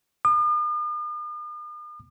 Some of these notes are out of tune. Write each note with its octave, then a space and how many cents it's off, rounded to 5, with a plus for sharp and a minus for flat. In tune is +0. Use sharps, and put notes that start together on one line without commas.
D#6 -45